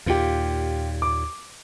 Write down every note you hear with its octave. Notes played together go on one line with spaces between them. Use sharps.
D#2 A#2 F4 G4
D6